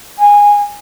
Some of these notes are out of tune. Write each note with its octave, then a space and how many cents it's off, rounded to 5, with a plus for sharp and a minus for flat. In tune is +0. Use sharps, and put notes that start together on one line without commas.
G#5 -15